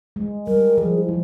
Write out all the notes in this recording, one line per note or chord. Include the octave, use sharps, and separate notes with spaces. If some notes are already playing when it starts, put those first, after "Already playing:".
G#3
G3 A#4
F3 G#4
E4
F3